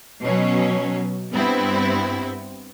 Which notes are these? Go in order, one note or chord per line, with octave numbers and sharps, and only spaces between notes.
B2 F#3 C#4
G2 B3 C4 E4